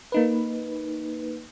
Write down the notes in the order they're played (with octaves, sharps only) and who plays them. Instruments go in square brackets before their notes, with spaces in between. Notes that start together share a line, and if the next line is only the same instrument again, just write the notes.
[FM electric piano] A#3 D#4 B4